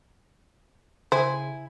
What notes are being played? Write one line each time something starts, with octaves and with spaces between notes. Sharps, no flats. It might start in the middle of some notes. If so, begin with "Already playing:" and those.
C#3 E4 C5 G#5